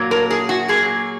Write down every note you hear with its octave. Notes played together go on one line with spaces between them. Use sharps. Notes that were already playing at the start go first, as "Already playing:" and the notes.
Already playing: A#2 F#3 A#3
A#4
G#4
F#4
A#2 F#3 A#3 G#4